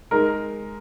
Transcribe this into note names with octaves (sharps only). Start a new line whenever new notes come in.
G#3 D#4 A#4